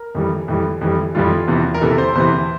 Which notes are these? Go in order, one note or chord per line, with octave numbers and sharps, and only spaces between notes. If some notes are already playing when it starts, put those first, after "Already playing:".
Already playing: A#4
F2 E3 G3
F2 E3 G3
F2 E3 G3
F2 E3 G3 F4
E2 C3 E3
A#4
E2 C3 E3 A4
C5
E2 C3 E3 C5